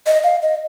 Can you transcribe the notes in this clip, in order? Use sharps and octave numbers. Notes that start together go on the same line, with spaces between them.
D#5
F5
D#5